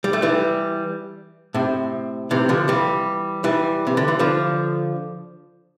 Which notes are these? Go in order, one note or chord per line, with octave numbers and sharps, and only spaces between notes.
G3
A3
E3 G3
A2 C3
C3 E3
D3 F3
E3 G3
E3 G3
C3
D3
E3
D3 F3